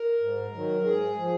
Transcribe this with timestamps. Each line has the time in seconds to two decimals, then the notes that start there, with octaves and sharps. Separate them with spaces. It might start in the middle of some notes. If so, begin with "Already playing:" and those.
Already playing: A#4
0.21 G#2
0.53 D#3 F#3
0.85 G#2 G#4
1.17 F3